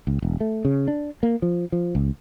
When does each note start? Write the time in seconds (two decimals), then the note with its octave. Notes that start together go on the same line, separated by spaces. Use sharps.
0.07 C#2
0.22 E1
0.40 A3
0.65 C#3
0.88 D4
1.23 A#3
1.42 F3
1.72 F3
1.95 C#2